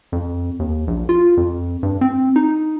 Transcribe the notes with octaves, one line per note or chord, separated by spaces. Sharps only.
F2
D#2
A#1
F4
F2
G2
C4
D#4